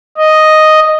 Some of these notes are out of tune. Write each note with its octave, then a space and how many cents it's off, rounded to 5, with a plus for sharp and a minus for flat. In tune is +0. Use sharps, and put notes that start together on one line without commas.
D#5 +0